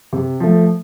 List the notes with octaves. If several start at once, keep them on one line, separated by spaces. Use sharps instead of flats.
C3
F3 A3